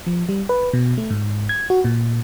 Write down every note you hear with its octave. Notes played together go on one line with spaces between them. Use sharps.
F3
G3
B4
B2
A3
G#2
G#6
F#4
A#2